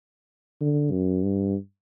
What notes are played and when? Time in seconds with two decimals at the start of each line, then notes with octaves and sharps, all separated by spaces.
0.61 D3
0.92 F#2
1.23 G2